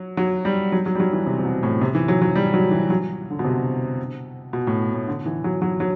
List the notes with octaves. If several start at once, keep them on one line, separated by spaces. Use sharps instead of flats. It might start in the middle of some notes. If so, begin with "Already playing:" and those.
Already playing: F#3
F#3
G3
F#3
F#3
G3
F#3
E3
C3
C3
B2
A2
C3
E3
F#3
F#3
G3
F#3
E3
F#3
D3
B2
C3
B2
A2
A2
D3
E3
F#3
F#3
F#3